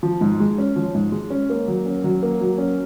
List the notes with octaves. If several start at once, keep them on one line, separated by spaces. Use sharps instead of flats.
F3
G#2
G#3
C#4
F3
G#2
G#3
C#4
A#3
F#3
C#4
F#3
A#3
F#3
C#4